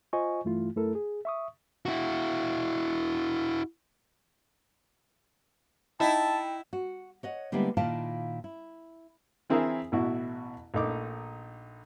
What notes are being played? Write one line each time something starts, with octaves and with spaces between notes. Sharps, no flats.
F4 C5 D#5 G#5 C#6
G2 E3 A3 E4 F4
F#2 A3 E4 A4 A#4
G#4
E5 C#6 D#6
E4 F#4
D#4 E4 G5 A5
F#4
C#5 D#5 F#5
D3 G3 G#3 A#3 B3 E4
A#2 D#3 E4 F4 F5 A5
E4
E3 C4 E4 G#4 A#4 E5
A1 B2 E4 F#4
A#1 A3 D#4 D6